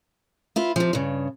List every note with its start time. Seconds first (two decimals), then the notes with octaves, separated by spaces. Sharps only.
0.56 E4 F4 B4
0.76 C3 F3
0.93 G2 C#3